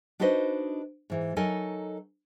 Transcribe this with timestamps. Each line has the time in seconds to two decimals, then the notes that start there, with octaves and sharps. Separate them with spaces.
0.20 D4 D#4 F#4 B4 C5 D#5
1.10 G#2 E3
1.36 F#3 D#4 A4 A#4 D#5 G#5